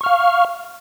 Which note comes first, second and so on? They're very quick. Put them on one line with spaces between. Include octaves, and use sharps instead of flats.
C#6 F6 F5